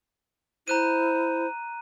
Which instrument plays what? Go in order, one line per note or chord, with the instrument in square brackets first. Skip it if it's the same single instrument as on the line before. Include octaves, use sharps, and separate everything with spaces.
[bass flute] E4 [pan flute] C5 [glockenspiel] A#5 F#6 D#7